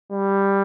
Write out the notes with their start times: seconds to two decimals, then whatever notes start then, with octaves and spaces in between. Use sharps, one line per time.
0.12 G3